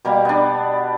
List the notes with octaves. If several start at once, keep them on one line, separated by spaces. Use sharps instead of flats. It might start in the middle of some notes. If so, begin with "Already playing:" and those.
B2 G3 A#3
B3 D4